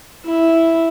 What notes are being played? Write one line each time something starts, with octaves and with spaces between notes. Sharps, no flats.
E4